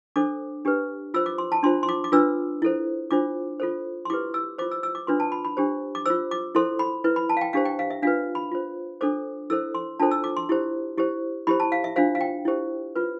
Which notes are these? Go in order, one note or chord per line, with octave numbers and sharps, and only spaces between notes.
D4 A4 C5 D6
D4 G4 B4
F4 C5 E6
D6
C6
A5
D4 F4 C5 C6
C6
D6
D6
D4 F4 B4 E6
E4 A4 C5
D4 F4 C5 D6
F4 A4 C5
C6
E4 G4 B4 D6
E6
F4 C5 D6
E6
E6
D6
D4 F4 B4 C6
A5
B5
B5
D4 G4 C5
D6
F4 C5 E6
D6
E4 A4 C5 C6
B5
E4 B4
B5
A5
F5
G5
D4 G4 C5 F5
G5
F5
E5
D4 F4 B4 F5
B5
F4 C5
D4 A4 C5 D6
E4 A4 C5 E6
C6
D4 F4 A4 C5 A5
E6
D6
C6
E4 G4 C5
E4 G4 C5
E4 G4 C5 B5
A5
F5
E5
D4 F4 C5 F5
F5
G5
E4 G4 C5
F4 B4